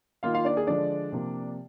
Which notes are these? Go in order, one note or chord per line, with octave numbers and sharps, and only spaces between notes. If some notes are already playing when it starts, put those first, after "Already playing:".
D#3 A#3 F4 F5
F4 F5
D4 D5
G#4
D3 F3 G#3 D4 D5
C3 F3 A#3